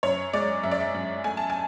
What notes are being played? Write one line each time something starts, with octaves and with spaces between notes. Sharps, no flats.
F#2 C#5
G#3 D5
F#2 E5
D5
E5
F#2
A3 G#5
A5
G#5